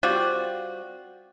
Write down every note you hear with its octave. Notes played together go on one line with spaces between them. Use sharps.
G3 C4 F4 F#4